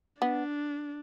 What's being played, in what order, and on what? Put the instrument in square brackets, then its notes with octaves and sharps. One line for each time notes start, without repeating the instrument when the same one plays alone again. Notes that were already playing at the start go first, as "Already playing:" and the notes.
[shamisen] B3 [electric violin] D4